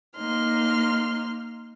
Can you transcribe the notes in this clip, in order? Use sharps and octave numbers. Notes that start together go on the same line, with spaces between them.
A#3 D#4 C6 F6